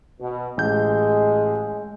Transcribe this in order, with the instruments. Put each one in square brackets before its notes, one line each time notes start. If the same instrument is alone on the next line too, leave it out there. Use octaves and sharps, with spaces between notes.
[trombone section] B2
[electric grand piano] A1 G6 [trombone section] G#3